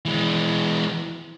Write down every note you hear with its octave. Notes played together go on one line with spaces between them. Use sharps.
E3 G#3